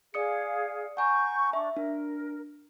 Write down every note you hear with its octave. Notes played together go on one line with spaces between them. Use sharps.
G#4 D5 F5 D#6 C#7
F#5 G#5 A#5 C#6 G6
D4 E5 C#6
D4 A#4